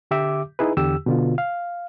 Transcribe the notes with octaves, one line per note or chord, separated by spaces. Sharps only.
D3 G4 E5 D6
D#4 E4 G#4 B4
E2 D3 G4 E6
B2 D3 F4
F5